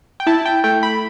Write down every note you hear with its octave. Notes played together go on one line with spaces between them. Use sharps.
G5
E4 A5
G5
A3 G5
B5